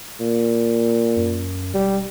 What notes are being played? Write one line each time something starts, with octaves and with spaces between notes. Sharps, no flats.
A#2
F#2
E1 G3